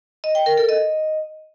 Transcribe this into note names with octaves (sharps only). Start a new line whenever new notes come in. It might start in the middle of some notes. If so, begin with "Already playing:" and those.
D#5
G5
A#4
A4
D#5